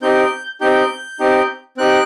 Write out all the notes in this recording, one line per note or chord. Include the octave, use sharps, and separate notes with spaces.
C4 D#4 G4 G6
C4 D#4 G4 G6
C4 D#4 G4
C4 D#4 G4 F#6